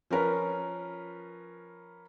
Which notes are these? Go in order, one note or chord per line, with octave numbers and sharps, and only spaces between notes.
F3 C#4 F4 A#4 B4 C#5